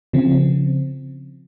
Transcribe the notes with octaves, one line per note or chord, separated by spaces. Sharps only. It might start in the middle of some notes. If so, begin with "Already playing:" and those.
C#3 F3 C4